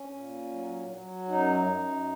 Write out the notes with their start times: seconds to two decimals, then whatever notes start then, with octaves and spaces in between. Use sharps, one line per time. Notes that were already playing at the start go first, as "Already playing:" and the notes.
Already playing: C#4
0.12 A#2
0.51 F#3
0.90 F#3
1.28 F#2 D#4
1.68 F#2